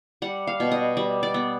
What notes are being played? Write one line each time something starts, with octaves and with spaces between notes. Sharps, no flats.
G3 F#5
F5
B2
D#5
G3
D5
B3